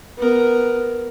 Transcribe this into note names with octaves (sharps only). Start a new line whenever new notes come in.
B3 A#4